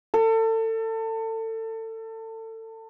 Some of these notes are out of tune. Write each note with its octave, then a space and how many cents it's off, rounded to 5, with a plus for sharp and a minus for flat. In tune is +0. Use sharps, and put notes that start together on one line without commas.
A4 +30